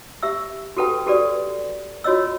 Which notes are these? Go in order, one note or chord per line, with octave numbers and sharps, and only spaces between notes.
G4 E5 E6
F#4 G4 A4 B4 G5
F#4 G4 A4 B4 D5
F4 F#4 C#5 D#5 E6